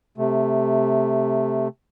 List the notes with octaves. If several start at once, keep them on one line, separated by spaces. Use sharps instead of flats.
C3 A3